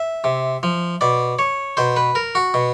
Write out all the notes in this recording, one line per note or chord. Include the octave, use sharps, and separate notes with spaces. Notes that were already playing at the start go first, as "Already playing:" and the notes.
Already playing: E5
C3
F3
B2 D5
C#5
B2 C5
B4
A#4
F#4
B2